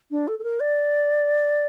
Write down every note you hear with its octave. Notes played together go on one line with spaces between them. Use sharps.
D4
A4
A4
A#4
D5